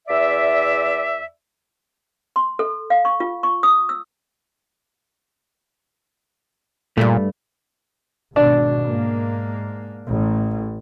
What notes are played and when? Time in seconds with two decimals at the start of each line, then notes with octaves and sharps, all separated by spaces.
0.08 E2 D5 E5
2.36 C6
2.59 A4
2.90 F5
3.05 C#6
3.20 F4
3.43 C#6
3.63 D#6
3.89 E6
6.98 G2 A#2 A3
8.36 G#1 B2 D4
8.84 G#2 A#3
10.07 A1